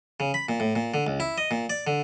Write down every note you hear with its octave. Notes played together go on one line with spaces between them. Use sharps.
C#3
B5
A#2
A2
A#2
D3
C#2
E4
D#5
A#2
D5
D3